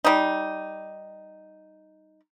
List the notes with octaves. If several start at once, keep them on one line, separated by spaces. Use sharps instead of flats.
G3 D#4